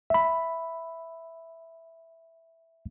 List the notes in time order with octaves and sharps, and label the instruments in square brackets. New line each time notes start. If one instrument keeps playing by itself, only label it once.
[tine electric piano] E5 B5